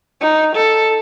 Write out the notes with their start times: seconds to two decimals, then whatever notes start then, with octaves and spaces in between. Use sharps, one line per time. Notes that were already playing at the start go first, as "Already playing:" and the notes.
0.21 D#4
0.56 A4